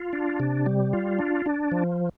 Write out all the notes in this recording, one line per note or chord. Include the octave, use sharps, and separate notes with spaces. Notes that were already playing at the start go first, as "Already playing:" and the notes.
Already playing: F4
D4
C3
G3
F4
D4
D4
F3